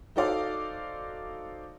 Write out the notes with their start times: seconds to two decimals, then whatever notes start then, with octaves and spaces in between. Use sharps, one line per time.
0.16 D#4 F#4 A4 C5 D5 F5